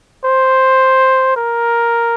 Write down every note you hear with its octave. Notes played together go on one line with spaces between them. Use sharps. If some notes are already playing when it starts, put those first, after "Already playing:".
C5
A#4